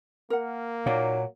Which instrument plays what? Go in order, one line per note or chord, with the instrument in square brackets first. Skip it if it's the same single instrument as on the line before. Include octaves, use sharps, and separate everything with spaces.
[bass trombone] A#3 [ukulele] A#4 F#5
[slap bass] A#2 [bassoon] F#3 [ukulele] D#4 D5 F5